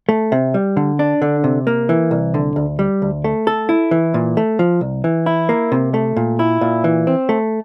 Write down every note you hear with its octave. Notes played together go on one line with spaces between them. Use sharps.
A3
C3
G3
D3
D4
D3
C3
A#3
E3
C2
D3
D2
G3
D2
A3
A4
E4
E3
A#2
A3
F3
C2
E3
E4
A#3
C3
A3
A#2
E4
A#2
E3
C4
A3